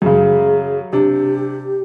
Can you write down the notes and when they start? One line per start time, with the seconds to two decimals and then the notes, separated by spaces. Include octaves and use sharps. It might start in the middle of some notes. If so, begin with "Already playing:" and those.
0.02 F#2 C#3 G#4
0.93 C3 D4 G4